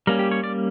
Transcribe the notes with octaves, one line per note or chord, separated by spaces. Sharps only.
G3 A#3 C#4 A#4
G4
C#5
D5